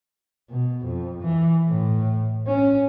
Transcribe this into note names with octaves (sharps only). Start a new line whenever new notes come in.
B2
F2
E3
A2
C#4